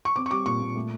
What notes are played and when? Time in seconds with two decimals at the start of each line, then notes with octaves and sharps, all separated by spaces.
0.05 C#6
0.16 C4 D6
0.26 C#6
0.31 G3 D6
0.46 A#2 C#6
0.62 A#2
0.76 A3